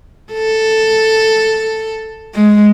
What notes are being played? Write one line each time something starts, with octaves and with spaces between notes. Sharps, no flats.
A4
G#3